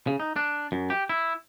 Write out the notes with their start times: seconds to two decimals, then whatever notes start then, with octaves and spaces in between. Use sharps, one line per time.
0.07 C#3
0.20 D#4
0.36 D4
0.72 F#2
0.90 G4
1.09 E4